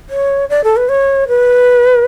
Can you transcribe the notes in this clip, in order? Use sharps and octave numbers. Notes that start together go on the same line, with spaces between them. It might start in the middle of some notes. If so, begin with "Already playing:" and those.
C#5
D5
A4
B4
C#5
B4